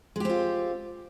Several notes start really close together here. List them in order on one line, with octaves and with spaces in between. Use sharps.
G#3 G4 C4 F4